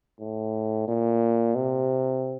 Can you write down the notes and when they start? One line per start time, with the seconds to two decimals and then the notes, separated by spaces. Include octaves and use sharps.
0.20 A2
0.88 A#2
1.55 C3